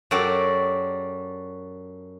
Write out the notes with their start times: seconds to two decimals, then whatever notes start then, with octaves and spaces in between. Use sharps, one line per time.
0.11 F#2 F#4 G4 A4 D5